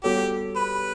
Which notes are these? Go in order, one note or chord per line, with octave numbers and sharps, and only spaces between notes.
G3 B3 F#4 G4 A4 C#5
B4